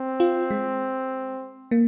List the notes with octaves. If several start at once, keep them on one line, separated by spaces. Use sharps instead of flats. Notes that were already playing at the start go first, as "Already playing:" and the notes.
Already playing: C4
F4
G#3
A#3